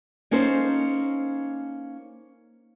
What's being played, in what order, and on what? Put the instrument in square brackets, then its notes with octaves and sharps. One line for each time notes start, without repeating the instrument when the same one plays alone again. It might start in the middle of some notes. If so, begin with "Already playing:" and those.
[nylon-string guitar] A#3 C#4 D#4 A4 C5